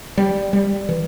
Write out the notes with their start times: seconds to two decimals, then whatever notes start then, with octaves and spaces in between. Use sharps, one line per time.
0.18 G3
0.53 G3
0.89 E3